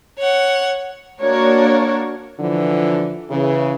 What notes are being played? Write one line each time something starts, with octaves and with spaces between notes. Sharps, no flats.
C#5 F#5
A#3 D4 F#4 A#4 C#5
D3 E3 F3
C#3 E3